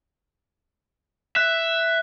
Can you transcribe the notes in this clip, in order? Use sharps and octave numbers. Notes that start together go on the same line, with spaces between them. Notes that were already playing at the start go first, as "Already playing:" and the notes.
E5 F#6